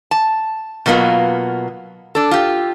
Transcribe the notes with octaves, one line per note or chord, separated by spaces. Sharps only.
A5
B2 F#3 A#3 B3 F4
D4 A4
F4 G4